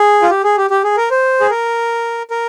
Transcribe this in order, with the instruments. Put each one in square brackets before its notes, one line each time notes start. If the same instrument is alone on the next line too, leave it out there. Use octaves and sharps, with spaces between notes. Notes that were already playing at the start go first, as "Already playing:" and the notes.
Already playing: [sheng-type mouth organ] G#4
F4
G4
G#4
G4
G4
G#4
A#4
C5
G#4
A#4
A#4